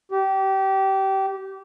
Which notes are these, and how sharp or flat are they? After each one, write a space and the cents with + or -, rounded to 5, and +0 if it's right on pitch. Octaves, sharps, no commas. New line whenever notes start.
G4 -25